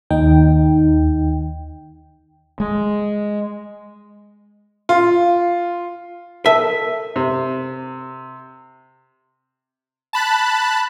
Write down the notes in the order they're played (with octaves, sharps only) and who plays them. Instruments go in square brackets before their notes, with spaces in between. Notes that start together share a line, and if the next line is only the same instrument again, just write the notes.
[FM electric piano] D#2 D#4 G5
[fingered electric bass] G#3
[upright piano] F4
[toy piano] A4 A#4 A5 [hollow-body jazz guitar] E5
[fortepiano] C3
[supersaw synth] A5 B5 F#6